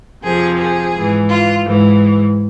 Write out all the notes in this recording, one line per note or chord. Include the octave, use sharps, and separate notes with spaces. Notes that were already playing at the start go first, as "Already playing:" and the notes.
F2 C3 F3 G#4
G#4
G#2 E3
F4
G#2 E3